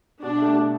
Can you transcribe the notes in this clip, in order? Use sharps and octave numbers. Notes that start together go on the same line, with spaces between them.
B2 D4
A3 G4 E5
B2